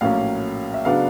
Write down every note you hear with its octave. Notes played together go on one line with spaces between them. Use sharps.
A#1 A2 F#3 A#3 C#4 F5
E5
C#3 F#3 B3 D4 F5